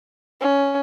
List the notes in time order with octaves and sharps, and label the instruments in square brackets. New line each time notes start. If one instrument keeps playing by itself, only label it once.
[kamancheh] C#4